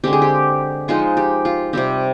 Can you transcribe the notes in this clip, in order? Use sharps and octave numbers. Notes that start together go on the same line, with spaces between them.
D3 G#3 C4 G4
G#4
G4
F3 G#3 D#4 F4
G4
F4
C3 G3 C4 G4